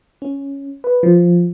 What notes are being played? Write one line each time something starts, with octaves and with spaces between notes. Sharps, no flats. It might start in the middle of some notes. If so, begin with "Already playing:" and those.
C#4
B4
F3